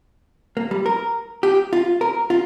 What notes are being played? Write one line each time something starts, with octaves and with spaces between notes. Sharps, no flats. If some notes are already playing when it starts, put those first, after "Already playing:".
A#3
G3
A#4
G4
F4
A#4
F4